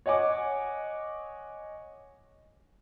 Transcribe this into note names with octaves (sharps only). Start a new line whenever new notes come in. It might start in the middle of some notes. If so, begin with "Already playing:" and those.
C#5 D#5 F#5 G#5 D6